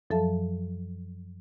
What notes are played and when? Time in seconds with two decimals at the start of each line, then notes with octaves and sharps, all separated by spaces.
0.10 F#2 F3 F#3 A4 E5 A5